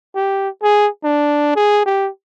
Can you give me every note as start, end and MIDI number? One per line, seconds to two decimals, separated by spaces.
0.16 0.49 67
0.63 0.88 68
1.04 1.52 62
1.55 1.83 68
1.86 2.09 67